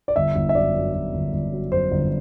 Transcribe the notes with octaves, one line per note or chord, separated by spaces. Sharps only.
D5
G1 E5
G1
E5
F#2 D5
F#2
F#2
G1
G1
F#3
F#2 C5
G1